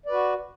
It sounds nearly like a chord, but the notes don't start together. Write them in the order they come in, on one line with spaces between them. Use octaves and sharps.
D5 B4 F#4